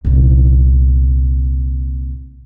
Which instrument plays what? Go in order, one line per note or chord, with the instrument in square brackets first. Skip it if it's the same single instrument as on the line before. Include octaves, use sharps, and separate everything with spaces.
[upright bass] C2 A#2